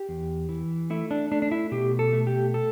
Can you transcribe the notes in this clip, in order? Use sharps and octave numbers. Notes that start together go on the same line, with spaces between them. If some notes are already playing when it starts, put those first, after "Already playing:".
Already playing: G4
E2
E3
A3 E4
D4
A3 D4
D4
E4
B2 G4
A4
A3
G4
A4